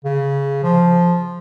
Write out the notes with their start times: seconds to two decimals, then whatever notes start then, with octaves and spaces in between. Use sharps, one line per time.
0.05 C#3
0.63 F3